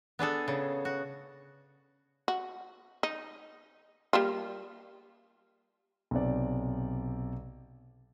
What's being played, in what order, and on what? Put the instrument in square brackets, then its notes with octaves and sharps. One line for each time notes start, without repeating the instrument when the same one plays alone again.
[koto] B3 D4 G#4 A4
C#3
F#4
[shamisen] F#4
D#4
G3 A#3 F4
[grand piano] B1 C3 D5